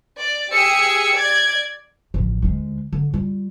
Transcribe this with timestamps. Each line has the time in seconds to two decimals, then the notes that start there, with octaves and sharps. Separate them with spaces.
0.17 D5
0.51 G4 G#4 E6 C#7
1.13 D5 G#6
2.14 A1 F3
2.42 D2 G#3
2.93 D3
3.14 G3 F4